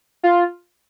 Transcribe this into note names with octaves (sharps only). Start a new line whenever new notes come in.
F4